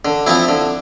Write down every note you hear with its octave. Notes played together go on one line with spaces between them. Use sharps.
D3
F3 C4 E4
D3